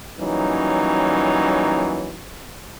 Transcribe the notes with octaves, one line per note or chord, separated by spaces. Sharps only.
E3 F#3 G3 A#3 C#4 D#4